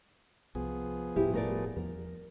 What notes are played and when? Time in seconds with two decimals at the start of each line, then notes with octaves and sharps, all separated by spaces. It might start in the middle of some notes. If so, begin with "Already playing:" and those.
0.55 C2 F3 B3 G#4
1.16 E1 A2 G3 E4 G4
1.34 A3 A#4 D5
1.76 E2 F3 B3 A#4